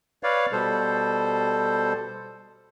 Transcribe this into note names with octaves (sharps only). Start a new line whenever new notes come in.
B4 C#5 D5 F5
B2 G3 A4 C5